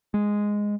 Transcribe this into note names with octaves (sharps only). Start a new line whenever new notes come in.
G#3